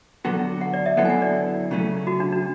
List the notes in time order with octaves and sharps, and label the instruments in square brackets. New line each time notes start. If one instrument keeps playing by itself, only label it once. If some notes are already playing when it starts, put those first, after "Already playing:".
[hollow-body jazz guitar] D3 F#3 B3 F#4 A4
[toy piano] F#5
D5
E5
[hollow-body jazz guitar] D3 F#3 B3 E4 A4 [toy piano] F#5
[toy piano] G#5
F#5
D5
[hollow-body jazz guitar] C#3 F#3 A3 C#4
[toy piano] F#4
D4
D4